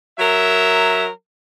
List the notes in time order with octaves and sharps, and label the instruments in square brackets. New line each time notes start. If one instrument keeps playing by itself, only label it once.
[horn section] F#3 A#4 E5